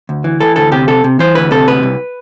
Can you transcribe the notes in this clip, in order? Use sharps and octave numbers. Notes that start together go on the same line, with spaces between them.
D2
E3
E3 A4
D2 A4
C3 G4
C3 A4
C3
E3 C5
D2 B4
C3 A4
D2 B4
C2